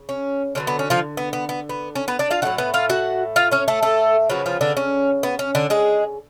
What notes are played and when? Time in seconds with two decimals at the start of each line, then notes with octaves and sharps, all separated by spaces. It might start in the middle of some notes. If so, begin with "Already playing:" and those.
Already playing: C#3
0.09 C#4
0.55 D3 F#3 B3 C#4
0.67 B3
0.79 C#4
0.90 F3 F4
1.17 B3
1.33 B3
1.49 B3
1.69 B3
1.95 C#4
2.08 B3 B4
2.19 D4 D5
2.31 F4 F5
2.42 A2 F#3 A3 F#4 F#5
2.58 B3 B4
2.74 F4 F5
2.90 F#4 F#5
3.36 F4 F5
3.51 C#4 C#5
3.68 A3 A4
3.83 A3 A4
4.30 C#3 F3 F#3 B3 F#4
4.46 F3 F4
4.61 D3 D4
4.77 C#4
5.23 B3
5.39 C#4
5.55 D3 D4
5.70 G#3 G#4